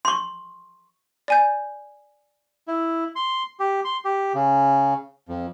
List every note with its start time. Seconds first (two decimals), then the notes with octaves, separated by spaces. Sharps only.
0.05 C6 C#6
1.28 D5 G#5 G6
2.68 E4
3.16 C6
3.60 G4
3.85 C6
4.05 G4
4.34 C#3
5.29 F2